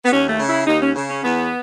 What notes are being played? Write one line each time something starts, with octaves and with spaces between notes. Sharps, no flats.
B3
D#2 C#4
A3
C#3
E4
D#2 D#4
C#4
C#3
C#4
E2 B3